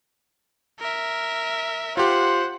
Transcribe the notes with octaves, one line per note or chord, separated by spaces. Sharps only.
A#4 E5
F4 G4 C5 F#5